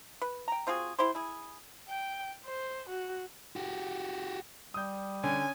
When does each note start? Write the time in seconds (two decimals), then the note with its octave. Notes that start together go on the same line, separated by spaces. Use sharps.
0.22 B4
0.48 G5 A#5
0.67 C4 F4 F#4 G#4
0.99 E4 G4 C5
1.15 E4 G#4
1.88 G5
2.46 C5
2.90 F#4
3.56 F#4 G4
4.74 G3 D#6 G6
5.24 D3 C#4 G#5